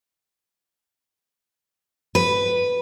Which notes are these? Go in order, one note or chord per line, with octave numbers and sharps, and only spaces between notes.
B4